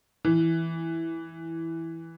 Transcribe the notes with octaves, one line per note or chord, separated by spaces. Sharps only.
E3